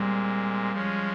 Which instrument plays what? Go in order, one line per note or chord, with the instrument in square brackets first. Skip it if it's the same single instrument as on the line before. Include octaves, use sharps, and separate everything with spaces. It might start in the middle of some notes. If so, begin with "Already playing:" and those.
Already playing: [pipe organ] A#2 G#3 C4 [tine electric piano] G3
[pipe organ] F3 G#3 C#4